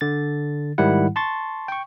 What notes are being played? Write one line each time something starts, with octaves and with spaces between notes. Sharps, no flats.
D3 A6
G#2 D#3 G3 E4 F#5
A5 C6 C#6 A6
G5 C#6